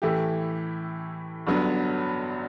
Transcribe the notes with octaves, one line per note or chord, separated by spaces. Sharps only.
A2 E3 A3 E4 G4
G1 G2 F#3 B3